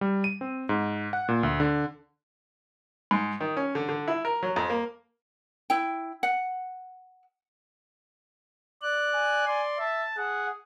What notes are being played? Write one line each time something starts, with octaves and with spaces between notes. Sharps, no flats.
G3
D#7
C4
G#2
F#5
A#2
D2
D3
G#2
D#3
C#4
D3
D3
E4
A#4
F#3
F2
A#3
E4 G5
F#5
D5 F#6
G#5
D5 C6
E5 A5
G#4 F#5